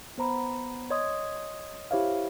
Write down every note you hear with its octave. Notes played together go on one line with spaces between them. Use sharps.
B3 C5 A#5 B5
C#5 D#5 C6 D#6 G#6
E4 G4 C5 C#5 E5 F5